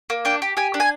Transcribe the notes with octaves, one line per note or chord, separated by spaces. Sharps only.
A#3
D4 G5
G4
G4 G#5
D4
G#5